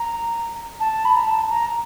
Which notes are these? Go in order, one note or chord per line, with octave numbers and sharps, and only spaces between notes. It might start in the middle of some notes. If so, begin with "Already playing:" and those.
Already playing: A#5
A5
B5
A#5
A5
A#5